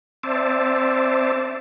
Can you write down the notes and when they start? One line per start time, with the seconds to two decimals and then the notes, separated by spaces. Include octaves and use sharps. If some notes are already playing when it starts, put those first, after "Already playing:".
0.23 C4 C5 D5 E5 A5